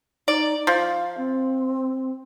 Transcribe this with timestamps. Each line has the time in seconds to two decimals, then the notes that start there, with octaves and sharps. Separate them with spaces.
0.28 D#4 D5
0.67 F3 F5
1.17 C4